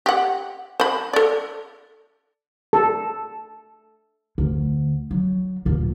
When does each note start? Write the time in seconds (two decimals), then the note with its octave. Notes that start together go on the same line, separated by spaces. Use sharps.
0.06 G4 F#5
0.80 C5 B5
1.13 A4 D5
2.73 A4
4.38 D2
5.11 F#3
5.65 D2 A#2